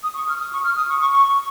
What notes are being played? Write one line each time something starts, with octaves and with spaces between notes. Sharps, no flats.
D#6
C#6
F6
D#6
C#6
F6
D#6
C#6
C#6
C#6